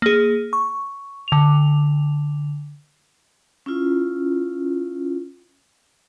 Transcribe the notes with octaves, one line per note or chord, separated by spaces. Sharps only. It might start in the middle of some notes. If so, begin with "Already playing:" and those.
A#3 G#4
C#6
D3 F7
C#4 E4 F4